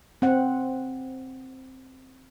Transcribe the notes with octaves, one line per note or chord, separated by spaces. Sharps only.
C4 F#5